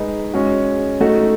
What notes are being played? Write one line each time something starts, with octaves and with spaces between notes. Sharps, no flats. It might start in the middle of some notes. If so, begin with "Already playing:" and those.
Already playing: G#3 D#4 G#4 B4
G#3 C#4 F#4
A3 D#4 F#4